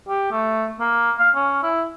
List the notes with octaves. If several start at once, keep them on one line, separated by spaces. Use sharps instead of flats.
G4
A3
A#3
F5
C#4
E4